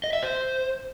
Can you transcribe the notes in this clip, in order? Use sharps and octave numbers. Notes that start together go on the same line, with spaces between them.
D#5
E5
C5